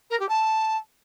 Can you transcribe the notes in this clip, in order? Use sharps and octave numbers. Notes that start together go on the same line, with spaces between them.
A#4
G4
A5